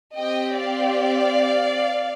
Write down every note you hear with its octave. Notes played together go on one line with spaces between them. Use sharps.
C4 G4 D#5 G5
D5 F5